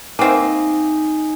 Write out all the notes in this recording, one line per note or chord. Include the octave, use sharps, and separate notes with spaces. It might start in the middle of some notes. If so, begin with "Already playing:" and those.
A#3 C4 D#4 E5 G#5